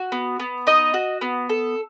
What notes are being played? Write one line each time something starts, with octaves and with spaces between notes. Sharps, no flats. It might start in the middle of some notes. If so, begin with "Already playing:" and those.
Already playing: F#4
B3
B3
D#4 D#5
F#4
B3
A4